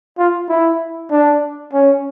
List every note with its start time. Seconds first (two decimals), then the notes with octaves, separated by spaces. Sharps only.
0.18 F4
0.49 E4
1.11 D4
1.73 C#4